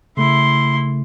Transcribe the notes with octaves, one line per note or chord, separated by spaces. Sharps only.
C#3 A3 E4 C6